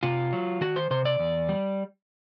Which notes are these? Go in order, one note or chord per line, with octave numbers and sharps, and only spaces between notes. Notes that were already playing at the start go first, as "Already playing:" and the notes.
C3 F4
F#3
D#3 F#4
C5
C3 C5
D5
E2
G3